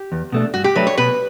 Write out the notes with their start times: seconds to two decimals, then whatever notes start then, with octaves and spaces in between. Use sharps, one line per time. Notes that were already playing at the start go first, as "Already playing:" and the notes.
Already playing: G4
0.12 E2
0.32 B2 A3 D4
0.54 G2 F#4
0.64 G4
0.76 F#3 A3 D4 B4
0.87 C#5
0.98 B2 B4